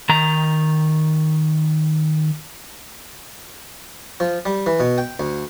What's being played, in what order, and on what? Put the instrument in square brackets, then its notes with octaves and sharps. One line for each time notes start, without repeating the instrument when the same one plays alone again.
[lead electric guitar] D#3 A#5
[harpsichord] F3
G3
E3
B2
G5
D2